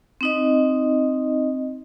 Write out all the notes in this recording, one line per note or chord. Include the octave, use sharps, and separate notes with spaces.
C4 D#4 D#5